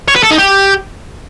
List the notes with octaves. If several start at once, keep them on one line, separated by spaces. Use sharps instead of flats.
C#5
B4
A4
D#4
G4